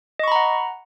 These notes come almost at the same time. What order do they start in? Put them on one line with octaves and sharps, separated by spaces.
D#5 C#6 B5 A#5 F#5